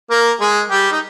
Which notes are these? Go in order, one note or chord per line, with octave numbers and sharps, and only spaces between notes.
A#3 A#4
G#3 G#4
G3 G4
D#4